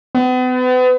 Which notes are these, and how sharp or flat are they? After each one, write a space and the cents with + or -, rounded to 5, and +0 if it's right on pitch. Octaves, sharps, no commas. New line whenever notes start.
B3 +40